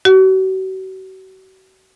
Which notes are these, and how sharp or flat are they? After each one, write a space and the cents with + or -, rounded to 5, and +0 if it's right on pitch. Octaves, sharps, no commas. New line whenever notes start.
F#4 +40